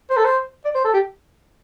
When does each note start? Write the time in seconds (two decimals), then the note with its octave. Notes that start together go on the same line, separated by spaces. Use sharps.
0.10 C5
0.17 A4
0.24 C5
0.65 D5
0.75 C5
0.84 A4
0.93 G4